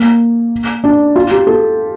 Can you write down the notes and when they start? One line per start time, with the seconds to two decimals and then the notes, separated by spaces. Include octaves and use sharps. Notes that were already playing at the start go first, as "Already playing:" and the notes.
Already playing: A#3
0.84 D4
1.16 F4
1.31 G4
1.47 A4